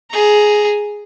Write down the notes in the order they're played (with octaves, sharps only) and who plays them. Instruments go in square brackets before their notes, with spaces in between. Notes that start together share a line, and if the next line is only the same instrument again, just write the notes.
[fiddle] G#4 A#5